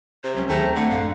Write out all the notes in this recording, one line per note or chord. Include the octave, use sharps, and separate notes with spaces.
C3 C5
C#2 F#3 C#4
D#2 D#3 A3 G#4 C5 G5 A#5
C4
D3 A3 F#5
A1 F#2 F5